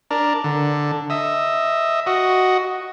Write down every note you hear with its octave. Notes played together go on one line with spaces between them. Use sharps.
D4 A#4
D3
D#5 E5
F#4 D#5